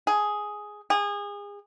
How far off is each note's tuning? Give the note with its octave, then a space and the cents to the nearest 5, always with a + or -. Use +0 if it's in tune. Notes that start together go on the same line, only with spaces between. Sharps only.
G#4 +5
G#4 -30